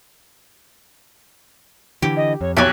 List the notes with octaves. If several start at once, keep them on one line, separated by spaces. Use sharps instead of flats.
D3 E3 G4
D#5
F2 C#5
B1 G4 A4 C#5 G#5 F#6